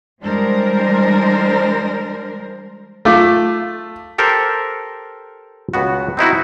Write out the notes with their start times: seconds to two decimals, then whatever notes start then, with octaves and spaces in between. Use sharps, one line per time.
0.22 E3 G3 G#3 D4 A#4 C5
3.05 A3 F4 D6
4.18 G4 A4 A#4 C5
5.74 C#2 B3 F#4
6.17 C4 D#4 E4 F#4